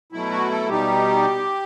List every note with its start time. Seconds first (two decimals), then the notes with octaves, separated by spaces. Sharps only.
0.13 B2 F#3 A3 E4
0.31 F#4
0.51 A4
0.69 B2 G3 D#4 G4